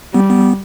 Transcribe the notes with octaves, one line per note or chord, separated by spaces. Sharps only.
G3 B3
B3